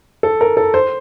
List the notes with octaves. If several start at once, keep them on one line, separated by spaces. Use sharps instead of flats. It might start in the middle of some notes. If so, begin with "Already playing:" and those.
A4
A#4
A4
C5